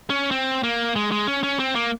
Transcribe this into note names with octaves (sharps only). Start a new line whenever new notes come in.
C#4
C4
A#3
G#3
G#3
C#4
C#4
C4
A#3